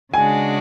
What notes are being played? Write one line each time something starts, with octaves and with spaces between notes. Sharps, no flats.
C#3 G#3 D4 F#4 G#5